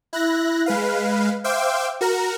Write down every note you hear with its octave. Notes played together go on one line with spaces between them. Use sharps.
E4 F#6 A#6
G#3 B4 F5
C5 E5 F5 G5 D6
F#4 A#4 A#5